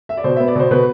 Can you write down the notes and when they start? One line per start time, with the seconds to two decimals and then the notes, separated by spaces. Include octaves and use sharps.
0.09 E5
0.17 D5
0.24 B2 C5
0.36 B3 E5
0.48 D5
0.55 B2 C5
0.71 B2 B4